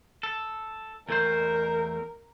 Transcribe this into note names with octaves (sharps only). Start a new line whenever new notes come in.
A4
E2 A3 A#4 C5